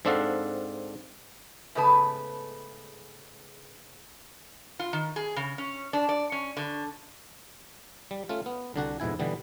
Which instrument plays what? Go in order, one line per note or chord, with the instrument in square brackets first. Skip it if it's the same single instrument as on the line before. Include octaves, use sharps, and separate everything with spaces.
[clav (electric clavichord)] G#2 C4 D4 A4 F5 F#5
[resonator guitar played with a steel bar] G#2 C#3 A3 B3 B4 A5
F4
D#3
G#4
C#3
C#4
D4
D5
C#4
D3
[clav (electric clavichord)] G3
A3 C#4 F4
B3
C2 D3 D4 F#4
F2 G#2 B2 E4 G#5
B2 D3 E3 G3 B3